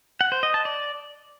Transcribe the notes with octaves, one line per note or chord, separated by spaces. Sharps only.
F#5
C5
D#5
A5
D5